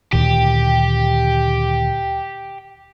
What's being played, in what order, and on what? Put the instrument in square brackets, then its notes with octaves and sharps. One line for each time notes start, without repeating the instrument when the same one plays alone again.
[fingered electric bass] D2 A#2 D#3 [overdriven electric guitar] G4